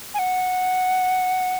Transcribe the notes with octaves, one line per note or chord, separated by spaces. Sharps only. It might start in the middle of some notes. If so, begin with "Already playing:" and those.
G#5
F#5